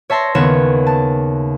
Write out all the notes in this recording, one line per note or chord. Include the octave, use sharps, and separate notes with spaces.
C#5 E5 A5 C6 A#6
D#2 C#3 B3 C#5 E7
A5